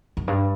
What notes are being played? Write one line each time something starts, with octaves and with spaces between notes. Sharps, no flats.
F#2
G2